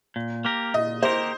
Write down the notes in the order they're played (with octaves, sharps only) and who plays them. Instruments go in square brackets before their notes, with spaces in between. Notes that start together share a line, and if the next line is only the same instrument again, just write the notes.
[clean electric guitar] A#2
A#3 G4 A#4
[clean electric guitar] A#2 [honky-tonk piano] D#5
[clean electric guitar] A#3 G4 A#4 [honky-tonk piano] C5